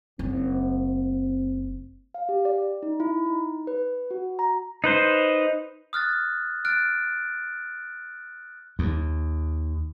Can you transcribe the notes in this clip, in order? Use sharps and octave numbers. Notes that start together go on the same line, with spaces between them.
F#1 C4
F5
G4
D5
D#4
E4
D#4
B4
F#4
A#5
D#4 B4 C5
D#6 F6 F#6 A6
F6 F#6 A6 D7
D#2